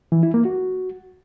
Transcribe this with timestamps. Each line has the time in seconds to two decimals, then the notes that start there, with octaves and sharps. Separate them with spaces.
0.12 E3
0.23 E4
0.34 A#3
0.45 F#4